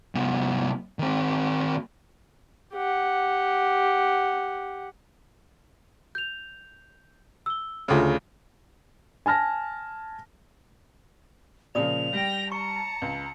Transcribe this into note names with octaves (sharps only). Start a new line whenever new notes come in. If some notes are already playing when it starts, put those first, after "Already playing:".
C2 B3
D#3 C4
G4 F#5
G6 F7
E6 G7
D2 C#3 F4 A4
G#5 A5 F6 A#6
A#2 C#3 F3 D5 D#6 F7
G3 G5 A#6
A5 A#5 C#6 C#7
C#2